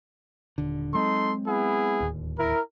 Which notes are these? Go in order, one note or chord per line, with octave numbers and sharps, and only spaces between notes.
D#1 D3
F#3 G#3 C4 D#4 A4 C6
B3 E4 G#4
D1 D#2
E4 A#4